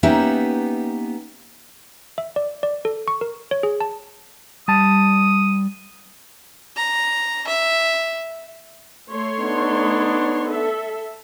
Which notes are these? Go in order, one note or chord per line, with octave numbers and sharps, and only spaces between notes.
A#3 B3 C#4 D#4 G4 E5
E5
D5
D5
A4
C#6
A#4
C#5
G#4
A5
G3 A5 D#6
A#5
E5
A3 C#5 C6
B3 D4 D#4
A4 E5